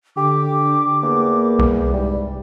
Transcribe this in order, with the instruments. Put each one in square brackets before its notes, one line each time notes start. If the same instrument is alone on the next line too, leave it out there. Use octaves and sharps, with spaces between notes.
[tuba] D3 [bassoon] G4 [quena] D6
[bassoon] E2 [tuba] A#3
[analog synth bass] C2
[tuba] G#2 [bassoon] G3